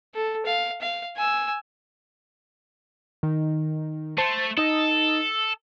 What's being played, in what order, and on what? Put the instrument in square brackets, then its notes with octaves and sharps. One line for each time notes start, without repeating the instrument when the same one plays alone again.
[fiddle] A4
F5
F5
G#5 E6
[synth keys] D#3
[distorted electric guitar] A3 [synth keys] C5 A5 C6
[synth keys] D#4 D#5 [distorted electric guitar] A4